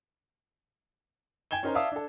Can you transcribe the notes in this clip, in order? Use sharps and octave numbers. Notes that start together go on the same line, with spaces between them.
G5 G#5 G#6 E7 G7
C#4 D#4 A#4 C5 A#5
D5 E5 F5 A5 D#6 E6
D4 A4